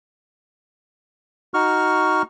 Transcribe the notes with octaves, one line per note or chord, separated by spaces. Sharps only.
D#4 F#4 C#6 F6